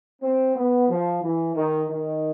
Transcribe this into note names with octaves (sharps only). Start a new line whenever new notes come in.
C4
B3
F3
E3
D#3
D#3